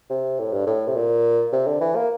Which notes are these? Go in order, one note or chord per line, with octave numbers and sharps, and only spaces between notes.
C3
A2
G2
A2
C3
A#2
C3
D3
E3
A#3